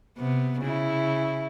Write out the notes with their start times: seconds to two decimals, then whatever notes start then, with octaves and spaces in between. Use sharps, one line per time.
0.18 C3 B3
0.61 C#3 E4